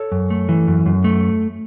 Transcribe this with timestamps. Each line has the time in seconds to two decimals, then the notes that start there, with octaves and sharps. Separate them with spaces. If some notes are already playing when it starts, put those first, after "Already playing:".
Already playing: A4 C#5
0.12 F#2
0.30 A3
0.49 E3
0.67 F#2
0.86 F#2
1.04 A3